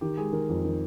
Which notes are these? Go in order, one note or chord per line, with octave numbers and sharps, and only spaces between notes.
D#3 G4
G#3 G#4
D#3 A#4
F2
D#3